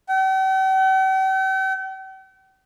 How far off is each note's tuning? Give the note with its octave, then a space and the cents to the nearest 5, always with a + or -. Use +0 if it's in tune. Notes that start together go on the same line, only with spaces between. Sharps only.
G5 -45